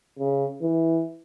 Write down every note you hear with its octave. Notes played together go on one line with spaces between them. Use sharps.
C#3
E3